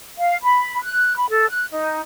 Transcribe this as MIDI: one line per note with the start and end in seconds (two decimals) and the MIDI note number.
0.18 0.37 77
0.43 0.81 83
0.82 1.17 90
1.17 1.29 83
1.30 1.50 69
1.50 1.66 90
1.70 2.01 63